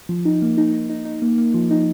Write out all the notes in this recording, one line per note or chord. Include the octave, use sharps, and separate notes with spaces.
F3
D#4
A#3
D#4
D#4
D#4
D#4
A#3
A#3
F3
D#4